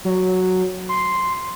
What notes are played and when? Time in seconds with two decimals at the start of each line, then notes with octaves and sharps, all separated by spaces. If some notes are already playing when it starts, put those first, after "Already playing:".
0.05 F#3
0.89 C6